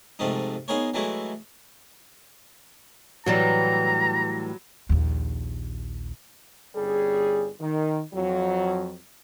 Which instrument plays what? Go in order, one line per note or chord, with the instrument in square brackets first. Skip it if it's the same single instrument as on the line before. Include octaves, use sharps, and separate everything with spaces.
[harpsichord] G#2 C3 F3 A3 D#4
B3 D#4 G#4 A#4 C5 C#5
E3 F#3 G#3 A3 E4
[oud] A2 E3 G3 [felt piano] F#3 [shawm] A#5
[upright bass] A#1 D#2
[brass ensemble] G1 G3 C#4 G#4
D#3
F2 F#3